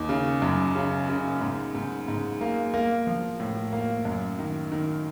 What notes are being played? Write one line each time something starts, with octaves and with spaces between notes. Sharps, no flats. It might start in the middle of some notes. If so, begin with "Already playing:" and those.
Already playing: D#2
C#3
F#2
C#3
C#3
G#2
G#2
G#2
A#3
A#3
F3
A2
A#3
F#2
D#3
D#3